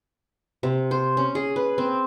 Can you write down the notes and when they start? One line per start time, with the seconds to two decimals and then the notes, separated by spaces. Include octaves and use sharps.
0.63 C3
0.91 C5
1.17 C#4
1.35 G#4
1.56 B4
1.78 C4